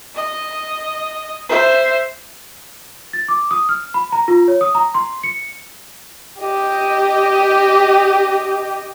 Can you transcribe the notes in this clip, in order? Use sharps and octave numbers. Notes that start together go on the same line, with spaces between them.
D#5
C5 E5
A6
D6
D#6
F6
B5
A#5
F4
C#5
D#6
A#5
C6
C#7
G4 D#5